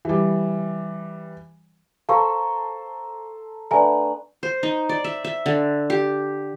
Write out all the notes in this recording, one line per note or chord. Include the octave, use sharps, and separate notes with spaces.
E3 G3
A4 C5 F5 A#5 C#6
A3 B3 D4 G#5 A#5
C5
D#4
D5
E5
E5
D3
G4